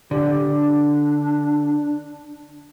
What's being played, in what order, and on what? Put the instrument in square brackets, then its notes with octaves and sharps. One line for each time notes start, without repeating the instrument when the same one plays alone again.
[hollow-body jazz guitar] D3 [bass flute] G4
[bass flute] D4